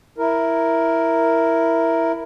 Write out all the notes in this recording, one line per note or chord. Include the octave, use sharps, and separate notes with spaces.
E4 A#4